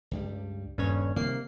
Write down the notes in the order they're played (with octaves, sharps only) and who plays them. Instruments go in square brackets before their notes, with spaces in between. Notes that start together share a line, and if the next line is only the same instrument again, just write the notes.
[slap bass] C#2 G2 G3
[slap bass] D#1 [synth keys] G2 C#4 C#5
[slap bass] C3 D#3 G3 [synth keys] A#3 C7